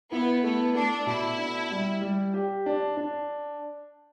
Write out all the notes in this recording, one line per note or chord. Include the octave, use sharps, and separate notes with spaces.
B3 E4
A3 B3
A3 D4
B2 E4
D4
G3
G3
G4
D4
D4